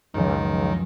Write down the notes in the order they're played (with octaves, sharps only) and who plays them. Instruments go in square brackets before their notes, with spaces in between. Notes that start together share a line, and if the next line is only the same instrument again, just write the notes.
[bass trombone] C#2 [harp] F#2 F3 [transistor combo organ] D#3